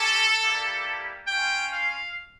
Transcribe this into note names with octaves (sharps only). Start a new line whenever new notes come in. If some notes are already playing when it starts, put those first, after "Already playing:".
Already playing: C#4 E4 G4 A4
G3 A#3 E4 G4
C#4 F4 G5
F5